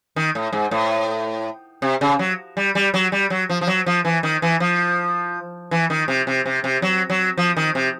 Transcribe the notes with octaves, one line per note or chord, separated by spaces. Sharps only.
D#3
A2
G#2
A2
C3
C#3
F#3
G3
G3
F#3
G3
F#3
F3
F3
F#3
F3
E3
D#3
E3
F3
E3
D#3
C3
C3
C3
C3
F#3
F#3
F3
D#3
C3